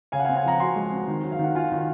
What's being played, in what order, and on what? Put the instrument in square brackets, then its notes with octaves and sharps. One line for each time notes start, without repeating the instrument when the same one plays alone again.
[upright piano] C#3 [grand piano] F5 G#5
[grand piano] F#5
F5 G#5
[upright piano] C4
[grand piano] F5 G#5
[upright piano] F3 [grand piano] F#5 A#5
[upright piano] F#4 [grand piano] G#5 C6
[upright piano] G#3
C4
D#3
F#3
[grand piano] F5
[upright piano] D#3 [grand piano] F#5
[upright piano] F4 [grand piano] F5 G#5
[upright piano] D#3
[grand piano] F#5